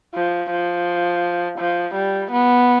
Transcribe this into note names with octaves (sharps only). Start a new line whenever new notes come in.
F3
F3
F3
G3
B3